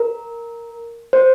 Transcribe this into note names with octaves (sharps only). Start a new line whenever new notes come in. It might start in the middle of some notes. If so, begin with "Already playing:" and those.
Already playing: A#4
C5